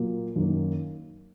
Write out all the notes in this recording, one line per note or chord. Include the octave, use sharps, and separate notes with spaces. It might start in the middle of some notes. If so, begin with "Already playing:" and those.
Already playing: A#2 F#3 A#3
F#2 D#3 F#3 A#3